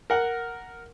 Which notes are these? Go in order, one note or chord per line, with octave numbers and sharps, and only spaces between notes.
A#4 F#5